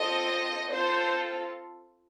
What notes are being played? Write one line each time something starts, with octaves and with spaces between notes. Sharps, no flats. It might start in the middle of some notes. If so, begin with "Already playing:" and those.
Already playing: C4 F4 A4 D#5
C4 F4 A4 C5